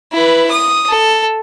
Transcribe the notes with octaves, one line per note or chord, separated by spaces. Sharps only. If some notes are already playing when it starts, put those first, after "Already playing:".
E4 B4
D#6
A4